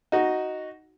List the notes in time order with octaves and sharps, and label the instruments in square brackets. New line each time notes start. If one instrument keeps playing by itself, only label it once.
[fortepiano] D#4 F#4